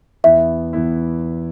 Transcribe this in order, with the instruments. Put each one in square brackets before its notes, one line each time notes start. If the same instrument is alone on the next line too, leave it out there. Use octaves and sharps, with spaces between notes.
[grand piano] E2 E3 B3 E4 [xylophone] E5
[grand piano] E2 E3 B3 E4